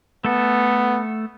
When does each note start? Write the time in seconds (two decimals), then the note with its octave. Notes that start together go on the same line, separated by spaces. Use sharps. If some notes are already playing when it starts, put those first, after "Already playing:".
0.25 A3 B3 A4